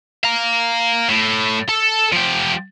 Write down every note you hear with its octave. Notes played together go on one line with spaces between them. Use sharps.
F5 A#5
A2
A4
F3 G4